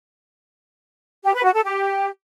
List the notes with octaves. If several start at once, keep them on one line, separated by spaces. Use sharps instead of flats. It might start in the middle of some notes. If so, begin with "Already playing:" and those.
G4
B4
F#4
A4
G4